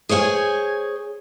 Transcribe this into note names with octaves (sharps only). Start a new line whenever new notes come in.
G#4 C5 C#5 F5 G#5